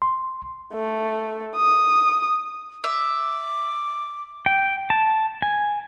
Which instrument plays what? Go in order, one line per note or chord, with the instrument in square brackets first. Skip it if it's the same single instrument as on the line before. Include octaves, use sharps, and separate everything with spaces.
[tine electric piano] C6
[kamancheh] A3
D#6
[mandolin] E5 [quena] D6
[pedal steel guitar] G5
A5
G#5